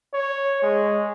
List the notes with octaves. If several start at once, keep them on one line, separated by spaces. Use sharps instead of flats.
C#5
G#3